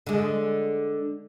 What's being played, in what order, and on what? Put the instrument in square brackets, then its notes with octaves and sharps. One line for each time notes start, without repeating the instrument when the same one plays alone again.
[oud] D3 G#3